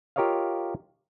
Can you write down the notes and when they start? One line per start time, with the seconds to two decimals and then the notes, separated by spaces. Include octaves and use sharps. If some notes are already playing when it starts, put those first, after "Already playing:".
0.16 F4 G4 A#4 C#5 D#5 F5